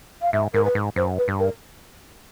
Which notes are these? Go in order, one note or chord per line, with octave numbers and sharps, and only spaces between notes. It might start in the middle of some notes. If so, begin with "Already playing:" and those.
F5
G#2 E5
G#2 A#4
B4
G#2
F#2 C5
B4
G2
A#4